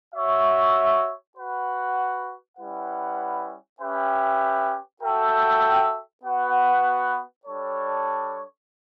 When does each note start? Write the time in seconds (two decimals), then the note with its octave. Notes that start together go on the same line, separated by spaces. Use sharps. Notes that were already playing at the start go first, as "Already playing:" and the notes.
0.14 F#4 C#5 E5
1.36 F#4 B4 F#5
2.57 G3 C#4 E4 B4 F#5
3.79 C#4 G4 B4 E5 G5
5.01 F#4 A4 E5 G5
6.23 B3 F#4 B4 F#5
7.45 G3 D4 A4 C#5